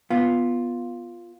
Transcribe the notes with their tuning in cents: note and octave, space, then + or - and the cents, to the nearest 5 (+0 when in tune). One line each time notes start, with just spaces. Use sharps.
B3 -5 F4 +0